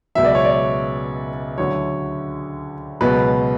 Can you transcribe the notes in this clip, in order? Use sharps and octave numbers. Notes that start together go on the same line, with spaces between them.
C#2 B2 F#3 E5
D5
C#5
D5
D2 D3 F#3 C#5
C#2 B2 F#3 B4